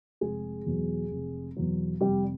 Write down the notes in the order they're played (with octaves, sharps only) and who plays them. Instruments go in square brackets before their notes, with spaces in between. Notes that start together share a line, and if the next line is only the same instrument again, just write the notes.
[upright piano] F1 G#3 G#4
E2 B2 F#3
F1
E2 B2 F#3
F1 G3 G4